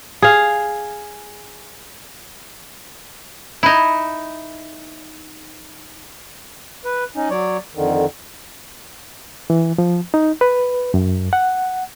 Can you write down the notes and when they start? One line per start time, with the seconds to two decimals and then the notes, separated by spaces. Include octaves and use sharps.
0.22 G#4 F5
3.63 D#4 E4
6.85 B4
7.16 C#4 D#4
7.30 F#3 C#5 D5
7.75 F2 D3 D#3
9.50 E3
9.78 F3
10.14 D#4
10.41 B4
10.94 F#2
11.33 F#5